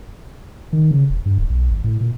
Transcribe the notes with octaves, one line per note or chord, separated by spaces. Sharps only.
D#3
C#3
E1
G2
D1
B1
G#1
A2
A#2